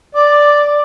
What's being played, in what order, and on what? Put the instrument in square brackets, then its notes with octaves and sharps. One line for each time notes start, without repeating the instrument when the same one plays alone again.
[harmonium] D5 [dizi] D6